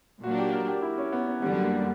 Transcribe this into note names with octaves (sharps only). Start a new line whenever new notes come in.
A#2 F#3 A#3 D4 F#4
G4
A#4
G4
E4
C#4
B3
C#4
F#2 D3 G3 B3
A#3